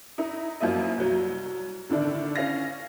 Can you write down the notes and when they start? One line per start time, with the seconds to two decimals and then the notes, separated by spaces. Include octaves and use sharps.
0.18 D#4 E4
0.61 F#2 F3 A#3 E4 D#5
0.98 C2 F#3
1.89 A2 D3 D#3 D4 E4
2.36 C#4 F5 A#6